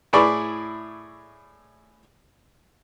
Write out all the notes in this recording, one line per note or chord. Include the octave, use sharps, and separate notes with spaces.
A2 E4 G#4 D5 B5 C#6